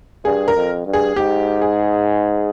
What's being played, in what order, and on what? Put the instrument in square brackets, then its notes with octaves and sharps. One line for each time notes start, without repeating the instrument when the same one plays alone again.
[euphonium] G2 [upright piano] G#4
[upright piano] A#4
[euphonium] F2
G2
[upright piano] G#4
[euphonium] G#2 [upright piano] G4
[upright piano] G#4